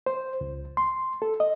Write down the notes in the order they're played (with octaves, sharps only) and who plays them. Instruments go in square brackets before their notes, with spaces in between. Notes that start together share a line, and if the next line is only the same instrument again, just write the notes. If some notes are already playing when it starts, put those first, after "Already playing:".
[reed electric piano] C5
C#2
C6
A4
D#5